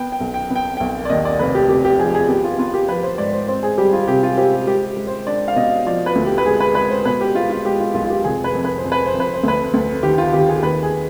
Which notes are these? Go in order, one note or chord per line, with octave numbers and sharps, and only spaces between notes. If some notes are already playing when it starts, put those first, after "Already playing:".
Already playing: B3 G5
G5
B1
G5
B3
G5
B1 G5
D5
D#2 D#5
D5
F1 B4
G4
F1 G4
G4
F3 G#4
G#4
B3 G4
F4
B3 F4
G4
F3 B4
C5
G#2 D5
C5
C4 C5
G#4
G3 G4
F4
C3 G4
F4
C4 G4
G#3 G4
G#3
C5
D4 D5
F5
B2 D#5
F3 D5
B4
D2
G4
B4
G#3 G#4
B4
G#3 B4
C5
B2 B4
G4
G#3 F4
F4
G#3 G4
F4
B1 F4
F4
G4
F1 G#4
B4
F2
B4
C5
F2
B4
C5
F2
B4
C5
D2 B4
D2
D#3 G4
F4
D#3 G4
G#4
D#2 B4
G#4